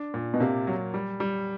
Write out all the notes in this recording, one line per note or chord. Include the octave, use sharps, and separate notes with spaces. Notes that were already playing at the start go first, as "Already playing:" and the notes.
Already playing: D4
A#2
B2
C3 A#3
F#3
G3
G3